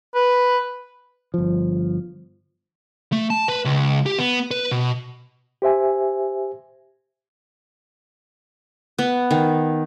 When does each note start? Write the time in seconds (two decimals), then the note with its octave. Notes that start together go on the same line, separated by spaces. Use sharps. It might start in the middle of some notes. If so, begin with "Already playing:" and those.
0.15 B4
1.34 G1 F3
3.12 A3
3.30 A5
3.48 B4
3.65 C#2
4.06 G4
4.18 B3
4.51 B4
4.71 B2
5.62 G4 C5 E5 G#5
8.98 B3
9.31 D#3